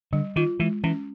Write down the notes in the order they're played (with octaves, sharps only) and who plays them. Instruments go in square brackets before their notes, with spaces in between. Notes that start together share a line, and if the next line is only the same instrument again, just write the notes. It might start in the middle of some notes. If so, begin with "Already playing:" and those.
[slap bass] D3 [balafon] G3
[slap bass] D#3 [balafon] F4
[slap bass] E3 [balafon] G#3
[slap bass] E3 [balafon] C#4